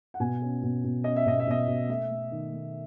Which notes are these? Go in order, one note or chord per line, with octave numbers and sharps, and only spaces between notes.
F#5
B2 G#5
C#4
B2
B2
C#4 D#5
E5
B2 D#5
E5
B2 D#5
B2
A3 E5
A3
D#3
A3